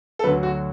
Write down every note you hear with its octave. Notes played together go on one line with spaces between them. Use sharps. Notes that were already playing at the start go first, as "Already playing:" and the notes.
A4
D2 D3 F#3 B4
F#4